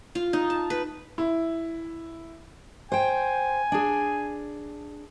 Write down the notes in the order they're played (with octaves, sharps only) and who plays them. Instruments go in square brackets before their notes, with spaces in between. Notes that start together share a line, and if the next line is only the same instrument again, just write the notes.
[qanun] F4
D#4
A5
B4
[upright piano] E4
[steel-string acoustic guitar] C5 G5 [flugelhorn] G#5
[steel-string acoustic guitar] D4 G#4